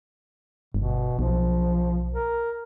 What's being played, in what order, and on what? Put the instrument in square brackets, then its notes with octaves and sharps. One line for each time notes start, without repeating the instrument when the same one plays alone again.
[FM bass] G1 [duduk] B2
[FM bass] B1 [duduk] F3
[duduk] A#4